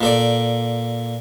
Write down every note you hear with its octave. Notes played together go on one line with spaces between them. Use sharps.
A#2 A4 D5